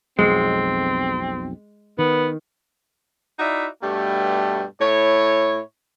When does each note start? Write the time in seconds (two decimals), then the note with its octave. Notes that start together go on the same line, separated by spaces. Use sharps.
0.19 B1 F2 B2 G#3 C4
1.99 D#3 B3
3.39 D#4 E4 F#4 D5 E5
3.83 G2 B2 G3 A3
4.81 A2 E4 C#5